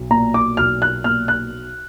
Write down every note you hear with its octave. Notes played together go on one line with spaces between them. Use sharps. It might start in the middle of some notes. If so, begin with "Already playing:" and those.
Already playing: B1
A#2 A#5
D6
B1 F6
F#6
A#2 F6
F#6